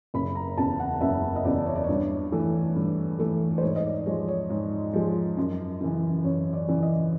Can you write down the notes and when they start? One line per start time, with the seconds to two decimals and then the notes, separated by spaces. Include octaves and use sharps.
0.14 F#1 B5
0.35 A#5
0.57 E2 C#3 A5
0.80 F#5
1.01 F#1 E5
1.36 D#5
1.44 E2 C#3 D5
1.66 C#5
1.75 D5
1.84 G2 C#5
2.32 E3 A3
2.76 G2
3.19 E3 A3
3.58 C5
3.62 G#2 C#5
3.76 D#5
3.85 D5
4.06 F3 G#3 C#5
4.28 C#5
4.50 G#2
4.93 F3 G#3
5.37 F#2
5.81 C#3 E3
6.24 F#2 C#5
6.53 D5
6.68 C#3 E3
6.82 D#5